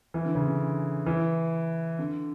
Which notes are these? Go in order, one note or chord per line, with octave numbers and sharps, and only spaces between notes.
E3
D3
C#3
D3
E3
D3